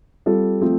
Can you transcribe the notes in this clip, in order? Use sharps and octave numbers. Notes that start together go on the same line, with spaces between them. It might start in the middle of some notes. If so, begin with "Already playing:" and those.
G3 C4 F4 A4
F3 A3 C4